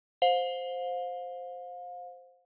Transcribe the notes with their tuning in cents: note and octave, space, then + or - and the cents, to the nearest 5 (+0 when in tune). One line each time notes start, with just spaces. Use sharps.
C5 +0 F5 +35